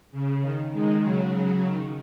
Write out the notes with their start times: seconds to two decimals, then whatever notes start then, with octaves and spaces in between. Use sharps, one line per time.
0.12 C#3
0.42 D#3
0.73 D#3 G#3
1.03 C#3 F#3
1.65 D#3